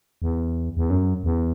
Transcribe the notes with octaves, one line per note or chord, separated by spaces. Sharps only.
E2
E2
F#2
E2